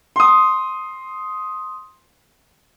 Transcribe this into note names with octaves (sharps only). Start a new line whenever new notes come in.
C6 D#6